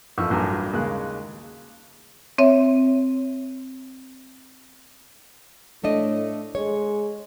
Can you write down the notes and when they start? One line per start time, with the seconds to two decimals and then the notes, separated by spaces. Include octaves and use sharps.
0.18 A1 F2 C#6 E6 F6
0.30 A1 G2 A#2 F#3 G#5 A#5
0.73 D#2 C#3 G#3 A#3 F#6
2.38 C4 C#5 E5
5.84 A2 A3 D4 D#5
6.55 G#3 C#5